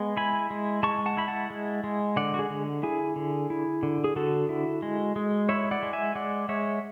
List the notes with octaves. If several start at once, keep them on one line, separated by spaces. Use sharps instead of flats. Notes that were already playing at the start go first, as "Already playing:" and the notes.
Already playing: G#3 B3
E4 G#5 B5
G#3
G#3 A5 C#6
F#5 A5
E4 B5
F#5 A5
G#3
G#3
D3 D5 F#5
F#4
G#4
D3
E4 G#4
D3
E4
D3
G#4
D3 F#4 A4
E4
G#3
G#3
E4 C#5 E5
D5 F#5
G#3
E5 G#5
G#3 D5 F#5
G#3 C#5 E5